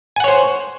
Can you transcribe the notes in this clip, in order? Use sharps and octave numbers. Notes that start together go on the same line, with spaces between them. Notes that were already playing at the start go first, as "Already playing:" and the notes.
C5 C#5 F#5 G#5